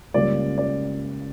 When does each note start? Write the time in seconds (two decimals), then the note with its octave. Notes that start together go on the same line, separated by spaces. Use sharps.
0.14 C#2 C#3 G3 A#3 D5
0.58 D5